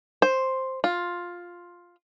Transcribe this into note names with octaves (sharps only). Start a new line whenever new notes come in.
C5
F4